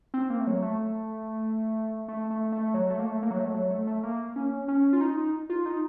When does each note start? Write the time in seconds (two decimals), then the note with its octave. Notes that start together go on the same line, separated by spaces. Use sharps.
0.14 C4
0.30 A#3
0.40 A3
0.47 F#3
0.62 A3
2.08 A3
2.30 A3
2.52 A3
2.74 F#3
2.90 A3
2.99 A#3
3.06 A3
3.23 A#3
3.31 F#3
3.39 A3
3.54 F#3
3.70 A3
3.87 A3
4.03 A#3
4.36 C#4
4.68 C#4
4.93 F4
5.01 D#4
5.50 F4
5.66 D#4